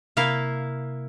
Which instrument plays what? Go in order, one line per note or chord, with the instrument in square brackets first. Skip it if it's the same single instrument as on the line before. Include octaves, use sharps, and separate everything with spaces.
[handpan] C3 [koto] A#3 E4 F5